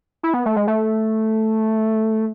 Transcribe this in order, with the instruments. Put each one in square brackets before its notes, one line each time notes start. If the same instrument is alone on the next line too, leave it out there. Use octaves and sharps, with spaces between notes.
[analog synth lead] E4
B3
A3
G#3
A3